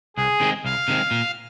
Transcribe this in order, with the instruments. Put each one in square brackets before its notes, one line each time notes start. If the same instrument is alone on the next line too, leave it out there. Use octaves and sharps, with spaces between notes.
[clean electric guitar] C2 [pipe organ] G#4
[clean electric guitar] C3 D#3 G#3 C4
[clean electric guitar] C2 [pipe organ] F5
[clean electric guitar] C3 D#3 G#3 C4
A#2